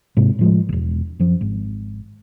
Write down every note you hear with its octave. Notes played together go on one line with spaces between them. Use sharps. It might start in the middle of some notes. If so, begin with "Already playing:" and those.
G#2 C3
A2 F3 G#3
E1 A#1
F#2 F3
G#1